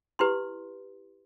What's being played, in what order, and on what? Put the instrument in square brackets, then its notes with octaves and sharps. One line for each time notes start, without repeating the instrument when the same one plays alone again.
[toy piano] E4 G4 B4 C6